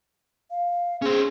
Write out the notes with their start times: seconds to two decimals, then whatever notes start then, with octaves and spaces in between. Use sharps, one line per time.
0.51 F5
1.02 C#4 G#4 C5